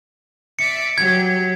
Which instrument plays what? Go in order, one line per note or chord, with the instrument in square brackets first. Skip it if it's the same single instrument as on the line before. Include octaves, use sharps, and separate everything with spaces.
[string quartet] D5 E5 D6 [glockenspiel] C#7
[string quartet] F#3 G4 [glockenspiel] G#6